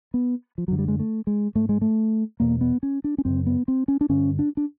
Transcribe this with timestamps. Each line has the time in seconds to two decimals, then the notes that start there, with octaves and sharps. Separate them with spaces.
0.14 B3
0.58 F3
0.68 F#2 D3 F#3
0.79 G3
0.88 G#3
0.99 A3
1.27 G#3
1.55 G#2 A3
1.69 G#3
1.81 A3
2.40 E2 B2 A#3
2.61 B3
2.83 C#4
3.04 D4
3.18 C#4
3.25 F#2 C#3 C4
3.46 B3
3.68 C4
3.88 C#4
4.01 D4
4.09 G2 D3 C#4
4.39 D4
4.57 D4